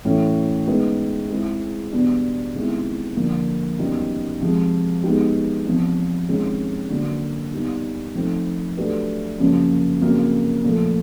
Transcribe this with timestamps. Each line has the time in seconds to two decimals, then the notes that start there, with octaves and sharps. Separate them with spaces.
0.05 A2 E3 A3 C#4
0.67 G#3 B3 D#4 G#4 B4
1.30 G#3 C4 E4 G#4
1.92 E2 B2 G3 B3 D4
2.54 C3 D#3 G#3 B3 E4
3.17 D3 F3 A#3
3.79 F#2 D#3 G3 B3 D#4
4.41 C3 F3 G#3
5.04 G#3 B3 D#4 G4
5.65 E2 C3 F3
6.28 C3 D#3 G#3 C#4
6.90 D3 F#3 A#3
7.52 G3 B3 D#4
8.15 F3 A3 C4 D#4
8.77 F#3 A3 D4 G4 B4
9.40 F#2 C#3 F3 A#3
10.02 F2 C#3 F#3 A#3
10.64 A#2 F3 A3